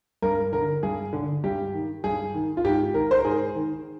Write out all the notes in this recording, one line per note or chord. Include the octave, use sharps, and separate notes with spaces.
G2 A#4
D3 A#4
G2 G#4
D3
G2 G4
D#3
G2 G#4
D#3
F4
G#2 G4
D#3 A#4
C5
A#4
G#2 G#4
D#3